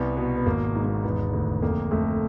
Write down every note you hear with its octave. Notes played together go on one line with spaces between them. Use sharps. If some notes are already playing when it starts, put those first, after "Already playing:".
Already playing: C2 B3
B2 B3
B3
G#1 A#3
G#2
A#3
E1 B3
D2
F2 A#3
F2 A3